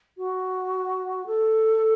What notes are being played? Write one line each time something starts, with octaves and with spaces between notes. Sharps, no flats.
F#4
A4